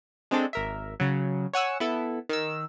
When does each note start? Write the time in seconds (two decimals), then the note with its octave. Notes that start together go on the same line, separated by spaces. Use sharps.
0.31 G#3 C4 D4 A4
0.53 G#1 A#4 E5
1.00 C#3 F#3
1.53 C#5 F#5 G#5 E6
1.80 B3 E4 A4
2.29 D#3 E6